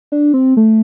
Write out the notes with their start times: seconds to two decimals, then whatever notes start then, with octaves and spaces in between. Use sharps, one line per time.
0.12 D4
0.34 C4
0.57 A3